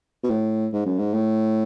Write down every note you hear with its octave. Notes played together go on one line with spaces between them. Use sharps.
B2
A2
G#2
F#2
G#2
A2